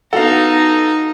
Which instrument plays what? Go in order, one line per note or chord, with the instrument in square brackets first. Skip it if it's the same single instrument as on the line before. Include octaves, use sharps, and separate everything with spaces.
[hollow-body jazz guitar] B3 F#4 F#5 [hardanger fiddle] D#4 A#5 [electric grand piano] A4 F5